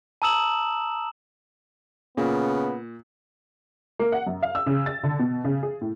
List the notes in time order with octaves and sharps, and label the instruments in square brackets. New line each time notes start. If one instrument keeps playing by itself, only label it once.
[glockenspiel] A5 A#5 D#6 E6 E7 F#7
[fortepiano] A#2 [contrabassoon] C#3 [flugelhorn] B3
[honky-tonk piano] A#3
F#5
F#2
F5
E6
C#3
A6
D3
B2
C#3
G#4
A2